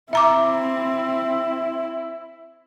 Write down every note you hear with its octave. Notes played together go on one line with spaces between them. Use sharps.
C4 E4 E5 A#5 D6